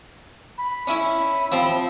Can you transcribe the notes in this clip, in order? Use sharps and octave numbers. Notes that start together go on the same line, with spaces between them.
B5
C#4 E4 B5
F3 C4